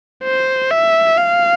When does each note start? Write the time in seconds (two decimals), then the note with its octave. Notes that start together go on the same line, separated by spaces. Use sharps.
0.24 C5
0.71 E5
1.18 F5